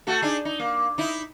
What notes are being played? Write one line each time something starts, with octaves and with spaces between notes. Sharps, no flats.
A3 F#4 A4
D4 D#4 G#4
D#4
A#3
D#4 E4